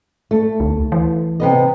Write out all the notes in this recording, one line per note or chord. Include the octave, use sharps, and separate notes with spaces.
A3
D2
E3
C3 B3 D#5